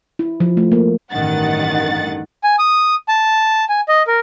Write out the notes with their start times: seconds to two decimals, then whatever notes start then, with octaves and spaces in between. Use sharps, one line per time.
0.19 E4
0.40 F3
0.57 A3
0.72 A#3
1.12 A1 G2 D#3 F#5 A6
2.44 G#5
2.59 D#6
3.09 A5
3.69 G#5
3.88 D#5
4.07 A#4